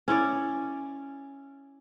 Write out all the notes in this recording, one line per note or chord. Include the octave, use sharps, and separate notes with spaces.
C#4 E4 C#5 D5